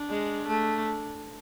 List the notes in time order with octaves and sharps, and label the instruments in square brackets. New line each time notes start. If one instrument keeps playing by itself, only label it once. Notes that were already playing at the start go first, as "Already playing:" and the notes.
Already playing: [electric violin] D4
[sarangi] G#3
A3